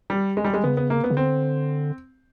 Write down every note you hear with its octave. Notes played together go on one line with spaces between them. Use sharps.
G3
G#3
G3
G#3
C#3 B3
B3
A#3
B3
C#3
D3 C4